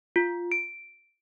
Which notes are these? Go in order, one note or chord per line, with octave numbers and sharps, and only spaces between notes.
F4
D7